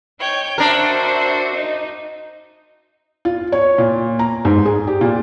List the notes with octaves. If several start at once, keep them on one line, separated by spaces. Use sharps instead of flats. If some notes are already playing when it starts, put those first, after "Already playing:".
D#4 C#5 G5
D4 F#4 A#4 C5 E5
D#4
F4
C#5
A#2
A#5
G#2
G#4
G4
A#2